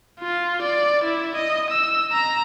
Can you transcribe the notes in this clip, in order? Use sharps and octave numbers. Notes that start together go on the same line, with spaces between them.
F4
D5
E4
D#5
E6
A#5